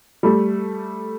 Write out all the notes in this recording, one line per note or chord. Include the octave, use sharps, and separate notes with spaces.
G3 A3